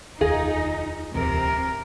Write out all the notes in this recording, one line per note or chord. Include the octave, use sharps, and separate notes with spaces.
F1 D#2 D#4 F4 G#4
D1 E2 C3 A#4